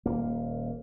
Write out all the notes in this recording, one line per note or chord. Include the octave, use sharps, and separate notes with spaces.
D#1 A#3